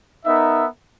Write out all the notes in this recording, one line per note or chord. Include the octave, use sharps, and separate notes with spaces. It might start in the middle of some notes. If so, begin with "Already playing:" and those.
B3 D#4 A#4 E5